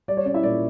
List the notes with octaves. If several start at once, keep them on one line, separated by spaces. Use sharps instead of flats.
G3 D5
C#5
C#4 D5
E4 E5
A#2 D5